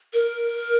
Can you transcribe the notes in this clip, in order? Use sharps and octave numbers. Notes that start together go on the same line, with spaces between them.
A#4